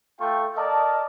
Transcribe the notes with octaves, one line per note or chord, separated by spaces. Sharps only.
A3 F4 A4 G5 C#6
A#4 D5 D#5 A5